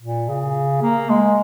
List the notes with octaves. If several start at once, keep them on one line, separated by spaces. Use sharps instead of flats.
A#2
C#3
A#3
G#3